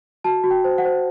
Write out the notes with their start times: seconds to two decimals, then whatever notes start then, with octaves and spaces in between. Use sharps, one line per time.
0.24 F#4 A5
0.44 F#4
0.51 G5
0.64 C5
0.78 F#5
0.85 C5